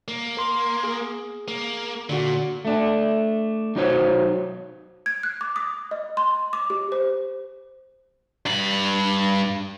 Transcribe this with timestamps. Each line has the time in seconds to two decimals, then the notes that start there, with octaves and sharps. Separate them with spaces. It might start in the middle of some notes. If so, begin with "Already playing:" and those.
0.08 A#3
0.37 A#4 C6
0.84 G#4
1.48 A#3
2.09 A#2 D3 F#4
2.65 A3 D4
3.76 F#3 D#4 F#4 C5 C#5
5.06 G#6
5.23 F#6
5.41 D6
5.56 D#6
5.91 D#5
6.17 C6
6.53 D6
6.70 G4
6.92 C5
8.46 G2 B5